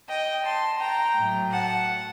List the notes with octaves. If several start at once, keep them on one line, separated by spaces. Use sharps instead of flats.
D#5 G5
A5 C6
G5 A#5
A2 F#3 A3
F#5 A5